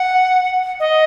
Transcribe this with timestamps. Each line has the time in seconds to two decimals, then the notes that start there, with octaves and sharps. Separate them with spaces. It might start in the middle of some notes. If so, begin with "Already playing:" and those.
Already playing: F#5
0.80 D#5